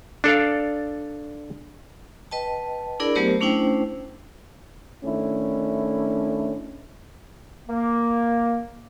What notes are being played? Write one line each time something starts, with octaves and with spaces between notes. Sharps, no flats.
D4 A4 D5 F5
B4 D#5 G5 A5
D4 E4 G#4 A#4 D5 B5
F#3 A3 B3 G4 A#4 C5
A3 C#4 D4 E4 C5 G5
D#3 A3 C#4 D4 E4
A#3